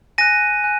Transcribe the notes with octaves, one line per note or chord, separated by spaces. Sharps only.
G#5 F#6 A#6 D#7
G#5 F#6